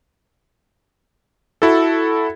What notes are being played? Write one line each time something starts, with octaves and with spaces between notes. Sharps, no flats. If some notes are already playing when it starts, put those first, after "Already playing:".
E4 F#4 A4